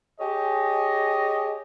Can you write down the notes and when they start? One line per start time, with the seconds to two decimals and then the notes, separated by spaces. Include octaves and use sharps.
0.20 G4 G#4 C#5 D#5